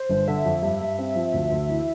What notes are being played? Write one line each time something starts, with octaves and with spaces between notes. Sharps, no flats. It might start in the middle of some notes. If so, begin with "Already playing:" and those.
Already playing: C5
G1
D3 E5
F2
G2
G2
C4
F3
D2
D2
E3